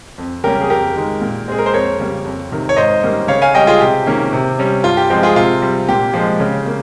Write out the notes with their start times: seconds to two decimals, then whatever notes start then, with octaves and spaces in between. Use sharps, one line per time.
0.18 F2
0.44 C#3 G3 A#3 C#4 G4 A#4
0.61 G#4
0.70 F2 G4 A#4
0.96 D#3 G#3
1.21 A#2
1.48 G#3 C4 G#4
1.58 A#4
1.66 C5
1.73 F2 A#4 C#5
1.99 C#3 G3 A#3
2.25 F2
2.51 C3 D#3
2.69 C#5
2.77 G#2 C5 D#5
3.03 D#3 G3 A#3 C#4
3.28 C#3 C#5 F5
3.42 F5 G#5
3.54 G3 C#4 D#5 G5
3.67 F4 G#4
3.81 C3 G4
4.06 D#3 A#3 C#4
4.33 C3
4.59 G3 C#4
4.84 G2 F4
4.97 G4
5.10 F3 G#3 C4 G4
5.23 F4 G#4
5.36 C3 F4
5.62 G3 C4
5.88 A#2 G4
6.14 F3 G#3
6.40 C#3
6.66 A#3